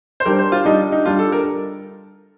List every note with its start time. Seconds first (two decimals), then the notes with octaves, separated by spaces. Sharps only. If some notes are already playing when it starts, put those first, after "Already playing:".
0.20 C5
0.25 G3 D4 G4 A#4
0.39 C5
0.52 F4
0.65 G3 D4 D#4 G4
0.92 D#4
1.05 G3 D4 F4 G4
1.19 A4
1.32 A#4